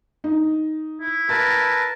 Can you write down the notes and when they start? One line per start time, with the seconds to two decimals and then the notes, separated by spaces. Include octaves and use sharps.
0.24 D#4
1.01 E4
1.29 A#4 B4 A5 A6